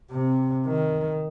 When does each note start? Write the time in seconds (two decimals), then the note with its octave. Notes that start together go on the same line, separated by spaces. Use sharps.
0.11 C3
0.67 D#3